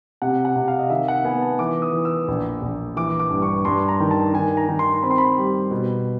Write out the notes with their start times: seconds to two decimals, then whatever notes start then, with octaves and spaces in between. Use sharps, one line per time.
0.22 C3 F#5
0.45 F#5
0.56 C3
0.68 F5
0.79 D#5
0.90 D#3 E5
1.08 F#5
1.25 B3 G#5
1.42 A5
1.59 E3 D6
1.82 D#6
1.93 E3
2.05 E6
2.28 A#1
2.62 A#1
2.96 E3 D6
3.19 D6
3.31 G2
3.42 C#6
3.65 G2 C6
3.89 A#5
4.00 D#3
4.11 A5
4.34 D#3 G#5
4.57 A#5
4.69 D#3
4.79 C6
5.03 C4 B5
5.11 C6
5.18 B5
5.38 G3
5.71 B2